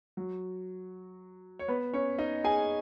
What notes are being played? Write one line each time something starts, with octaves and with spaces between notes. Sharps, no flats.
F#3 F#4
C#5
B3 B4
C#4 C#5
D#4 D#5
G#4 G#5